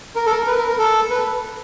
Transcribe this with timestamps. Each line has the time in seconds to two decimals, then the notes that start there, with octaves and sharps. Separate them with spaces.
0.16 A#4
0.26 A4
0.32 A#4
0.47 B4
0.58 A#4
0.68 A#4
0.79 A4
1.10 B4